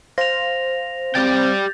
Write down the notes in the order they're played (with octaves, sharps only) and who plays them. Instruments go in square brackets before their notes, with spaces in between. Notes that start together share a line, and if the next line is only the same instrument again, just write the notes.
[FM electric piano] C5 F5 [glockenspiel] A#6 F7
[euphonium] C4 [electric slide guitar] G4 D5 G5 [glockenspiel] G6 A6